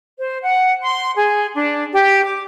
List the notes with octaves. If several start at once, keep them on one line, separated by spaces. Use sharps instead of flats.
C5
F#5
C6
G#4
D4
G4
D6